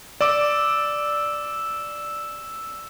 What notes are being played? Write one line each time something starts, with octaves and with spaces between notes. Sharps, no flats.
D5 D6 E6 E7